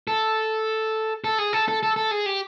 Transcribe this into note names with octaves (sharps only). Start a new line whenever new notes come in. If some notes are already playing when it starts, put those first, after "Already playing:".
A4
A4
G#4
A4
A4
A4
A4
G#4
G4